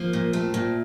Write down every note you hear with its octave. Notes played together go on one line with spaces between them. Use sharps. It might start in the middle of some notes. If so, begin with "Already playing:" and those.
Already playing: F3 A#3
A#2
A3 C4
A#2